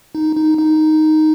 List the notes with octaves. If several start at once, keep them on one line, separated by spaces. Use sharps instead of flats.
D#4
D#4
D#4